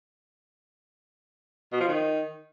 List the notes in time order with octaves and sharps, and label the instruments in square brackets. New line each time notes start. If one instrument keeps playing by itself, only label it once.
[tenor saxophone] B2
F3
D#3